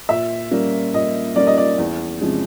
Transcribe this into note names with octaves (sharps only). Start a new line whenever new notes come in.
A#2 E5
G3 A#3 C#4
A#2 D#5
G3 A#3 C#4 D5
D#5
D5
E2
C3 F3 G#3 C#4